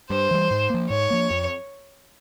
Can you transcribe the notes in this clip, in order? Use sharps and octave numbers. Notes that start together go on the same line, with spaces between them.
G2 C5
E3 G3
G#2
F3 A#3
G#2 C#5
F3 A#3
F2